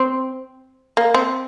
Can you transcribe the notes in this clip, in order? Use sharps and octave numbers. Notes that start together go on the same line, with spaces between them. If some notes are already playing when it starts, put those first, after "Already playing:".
Already playing: C4
A#3
C4